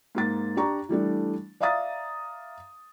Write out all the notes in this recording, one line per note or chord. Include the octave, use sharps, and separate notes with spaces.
G#2 A#3 A6
D4 G4 A#5 C#6
E3 G3 A3 D4
D5 E5 F5 A#5 D#6 A6